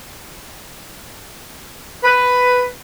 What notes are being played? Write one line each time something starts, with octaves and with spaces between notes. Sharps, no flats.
B4